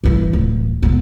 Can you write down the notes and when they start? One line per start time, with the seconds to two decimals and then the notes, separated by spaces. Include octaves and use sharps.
0.04 G2 E3
0.33 D1
0.82 E1 B3